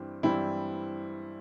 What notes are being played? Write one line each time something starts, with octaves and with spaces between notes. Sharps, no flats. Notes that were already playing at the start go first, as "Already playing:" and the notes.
Already playing: G2 E3 G3 C4
G2 E3 G3 C4 E4